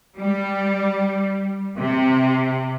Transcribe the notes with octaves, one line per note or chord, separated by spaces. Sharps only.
G3
C3